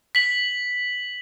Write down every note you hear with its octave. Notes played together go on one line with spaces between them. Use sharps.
B6 F#7